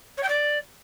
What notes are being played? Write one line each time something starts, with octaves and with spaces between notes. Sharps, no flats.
C#5
G5
D5